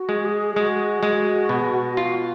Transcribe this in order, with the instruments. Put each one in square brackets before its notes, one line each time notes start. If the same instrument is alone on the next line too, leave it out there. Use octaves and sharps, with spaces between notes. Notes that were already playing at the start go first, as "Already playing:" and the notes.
Already playing: [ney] F#4
[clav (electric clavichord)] G#3
[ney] G#4
[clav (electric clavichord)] G#3 [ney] F#4
[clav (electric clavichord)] G#3
B2
F4